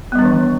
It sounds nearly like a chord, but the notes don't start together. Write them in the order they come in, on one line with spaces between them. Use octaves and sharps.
B3 G3 D4 D#3 E3